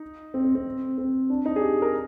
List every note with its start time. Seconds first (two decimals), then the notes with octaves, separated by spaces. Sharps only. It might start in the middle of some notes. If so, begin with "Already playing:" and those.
Already playing: D#4
0.34 C4
0.44 C4
0.55 C4
0.98 C4
1.30 D4
1.46 D#4
1.56 G#4
1.61 G4
1.82 A#4